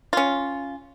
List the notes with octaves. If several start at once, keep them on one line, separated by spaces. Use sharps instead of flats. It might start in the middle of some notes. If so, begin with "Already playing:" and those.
C#4 F4